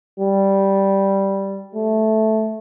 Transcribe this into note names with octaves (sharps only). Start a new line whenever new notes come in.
G3
A3